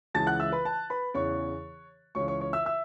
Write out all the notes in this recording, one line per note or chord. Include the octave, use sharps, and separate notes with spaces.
C#2 C#3 E3 A5 A6
F#5 F#6
E5 E6
B4 B5
A5
B4 B5
E2 C#3 E3 C#5 C#6
C#2 C#3 E3 C#5 C#6
C#5 C#6
C#5 C#6
E5 E6
E5 E6